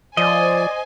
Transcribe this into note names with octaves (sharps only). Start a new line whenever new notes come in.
F3 C5 D5 D#5 G#5